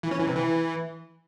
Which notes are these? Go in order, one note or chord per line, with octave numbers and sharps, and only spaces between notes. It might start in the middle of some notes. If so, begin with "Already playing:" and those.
E3
C#4
E3
C3
E3